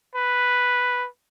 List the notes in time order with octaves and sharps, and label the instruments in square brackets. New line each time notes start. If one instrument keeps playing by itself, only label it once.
[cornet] B4